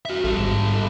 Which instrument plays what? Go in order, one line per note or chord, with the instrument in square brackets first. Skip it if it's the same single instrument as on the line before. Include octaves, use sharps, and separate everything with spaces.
[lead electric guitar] F#4 E5
[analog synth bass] A1 [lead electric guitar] G3 A4
[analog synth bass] G#2